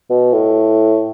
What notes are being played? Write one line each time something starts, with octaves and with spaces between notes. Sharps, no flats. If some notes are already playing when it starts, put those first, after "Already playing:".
B2
A2